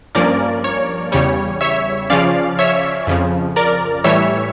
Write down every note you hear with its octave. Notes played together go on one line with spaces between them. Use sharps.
G2 F3 A#3 C#4 A#4 D5
C#5
E2 C#3 G3 C#5
C#5 E5
C#3 F3 C#4 D5 F5
C#5 E5
F2 C#3 F3
A#4 D5
A2 E3 G3 C#5 E5